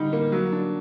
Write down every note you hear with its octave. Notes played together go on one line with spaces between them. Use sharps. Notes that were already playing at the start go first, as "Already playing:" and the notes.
Already playing: D3 G3 D#4
A#3
F#3
D4